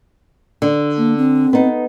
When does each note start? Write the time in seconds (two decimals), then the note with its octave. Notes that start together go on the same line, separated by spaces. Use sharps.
0.62 D3
0.97 A#3
1.17 C4
1.53 B3 D#4